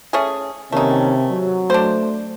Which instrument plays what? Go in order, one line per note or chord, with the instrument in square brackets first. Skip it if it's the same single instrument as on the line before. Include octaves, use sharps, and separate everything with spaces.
[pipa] A3 C#4 G#4
[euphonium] C3 [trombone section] D#3 A#3 C#4 [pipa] A3 D#4
[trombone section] F#3
[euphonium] A3 [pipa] D4 C5